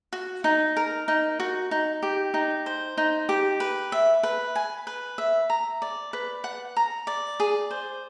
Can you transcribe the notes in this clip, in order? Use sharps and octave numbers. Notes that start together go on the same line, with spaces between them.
F#4
D#4
A#4
D#4
F#4
D#4
G4
D#4
C5
D#4
G4
B4
E5
B4
G#5
B4
E5
A#5
D5
B4
F#5
A#5
D5
G#4
C5